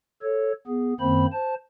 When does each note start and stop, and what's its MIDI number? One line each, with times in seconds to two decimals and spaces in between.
0.22 0.52 69
0.22 0.52 73
0.67 0.93 59
0.67 0.93 68
1.00 1.26 42
1.00 1.26 51
1.00 1.26 58
1.00 1.26 60
1.00 1.26 72
1.00 1.26 83
1.33 1.55 72
1.33 1.55 81